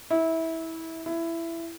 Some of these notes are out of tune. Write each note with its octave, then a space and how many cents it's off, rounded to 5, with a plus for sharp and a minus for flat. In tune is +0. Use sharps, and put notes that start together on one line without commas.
E4 -20
E4 +15